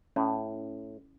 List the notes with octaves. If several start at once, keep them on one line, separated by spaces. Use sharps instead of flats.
A2 C#4 E4 D5